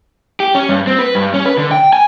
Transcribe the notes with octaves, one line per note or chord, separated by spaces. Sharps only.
G4
C#4
G2
C4
B4
G2
C#4
B4
D3
G5
G#5